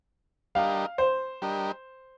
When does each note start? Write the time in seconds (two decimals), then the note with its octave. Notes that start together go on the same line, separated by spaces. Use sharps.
0.55 G3 D4 G4 A#4 D#5 F5
0.98 C5
1.42 G3 D4 G4 A#4 D#5